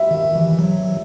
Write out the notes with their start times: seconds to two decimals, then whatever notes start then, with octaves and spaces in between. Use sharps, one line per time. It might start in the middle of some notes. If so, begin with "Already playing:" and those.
Already playing: E5
0.11 D#3
0.36 E3
0.59 F#3